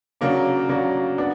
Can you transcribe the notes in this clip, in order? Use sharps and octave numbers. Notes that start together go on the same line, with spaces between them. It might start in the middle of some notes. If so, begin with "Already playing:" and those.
C#3 F#3 A#3 D4
C#3 F#3 A#3 D4
B3 D4